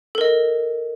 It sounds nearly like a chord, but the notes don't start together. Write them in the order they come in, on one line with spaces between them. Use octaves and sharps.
A4 A#4 D#5